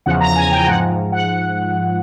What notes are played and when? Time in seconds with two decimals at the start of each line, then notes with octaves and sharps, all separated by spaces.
0.06 E2 C#3 F3 F#5
0.20 A#5
0.36 G#5
0.52 G5
0.67 G#2 F3 F#5
1.12 F#5